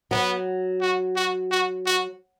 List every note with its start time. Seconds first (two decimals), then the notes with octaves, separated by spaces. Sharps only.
0.11 F#3 B3
0.81 F#4
1.16 F#4
1.51 F#4
1.86 F#4